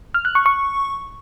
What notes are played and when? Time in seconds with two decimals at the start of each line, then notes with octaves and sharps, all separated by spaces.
0.14 F6
0.25 F#6
0.35 C#6
0.46 C#6